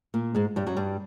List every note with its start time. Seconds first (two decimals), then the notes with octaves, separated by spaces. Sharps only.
0.14 A#2 A#3
0.35 G#2 G#3
0.56 G2 G3
0.67 F#2 F#3
0.77 G2 G3